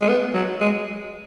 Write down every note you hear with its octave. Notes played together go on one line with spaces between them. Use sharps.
G#3
B3
F#3
G#3